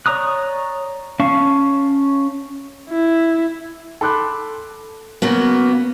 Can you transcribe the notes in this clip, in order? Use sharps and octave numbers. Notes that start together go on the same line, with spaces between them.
C#5 D5 A#5 D#6 F#6
C#4 F5 A5 C#6
E4
A4 B5 C6 D6 F#6
C#3 F#3 A#3 B3